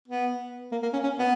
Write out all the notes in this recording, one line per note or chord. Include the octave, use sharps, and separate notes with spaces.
B3
A#3
A#3
C#4
C#4
B3